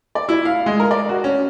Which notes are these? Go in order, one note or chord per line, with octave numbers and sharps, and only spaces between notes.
D5
E4
F5
G#3
A#4
D5
F#4
C#4